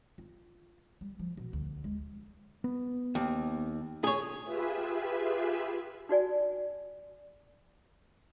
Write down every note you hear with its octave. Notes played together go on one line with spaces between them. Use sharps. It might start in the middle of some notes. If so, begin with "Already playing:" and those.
F4
G3
F3
B2
D2
G#3
B3
D#2
G#4 C#5
F4 G4 G#4 B4 E5
D#4 F#4 D5 G#5